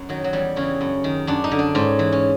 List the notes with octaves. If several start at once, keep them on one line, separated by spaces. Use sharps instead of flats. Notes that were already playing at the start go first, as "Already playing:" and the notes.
Already playing: F#2
D#3 F#3
F#3
E2 G3
C#3 E3 C#4
F#2
D#3
F#2 D4
D#4
D3
D4
G#2 C#4
E3
C#4